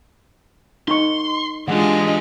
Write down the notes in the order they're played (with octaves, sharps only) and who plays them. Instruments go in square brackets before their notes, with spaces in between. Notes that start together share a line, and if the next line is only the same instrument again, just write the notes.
[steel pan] D#4 C#6 [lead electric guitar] C6
[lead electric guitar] E3 G4 [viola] G#3 [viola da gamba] D4 F4 D#5 [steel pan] F#5